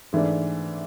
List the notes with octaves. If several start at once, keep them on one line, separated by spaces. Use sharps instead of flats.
G#2 E3 A3 D4